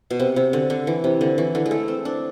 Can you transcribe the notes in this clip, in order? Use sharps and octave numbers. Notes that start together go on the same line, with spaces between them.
B2
C3
C3
D3
D3
E3
C3
D3
E3
D3
G#3
A3
C4
D4